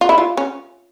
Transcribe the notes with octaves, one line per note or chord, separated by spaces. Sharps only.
F4
E4
F4
C#4